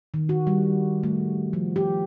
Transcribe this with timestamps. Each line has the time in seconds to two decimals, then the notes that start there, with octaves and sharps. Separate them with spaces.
0.14 D#3
0.29 F#4
0.47 G3
1.03 A3
1.53 F3
1.76 G4